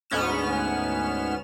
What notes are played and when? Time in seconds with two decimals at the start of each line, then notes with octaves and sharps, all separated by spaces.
0.10 D2 G#2 B3 C#4 F6 E7